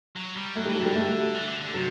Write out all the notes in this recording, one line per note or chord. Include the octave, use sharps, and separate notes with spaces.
F#3
G3
F#3 A3
G3
E3
F#3
D3 G3
A3
E3
D3
D3
C3 F#3